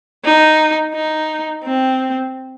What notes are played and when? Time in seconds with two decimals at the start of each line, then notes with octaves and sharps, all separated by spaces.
0.24 D#4
0.94 D#4
1.64 C4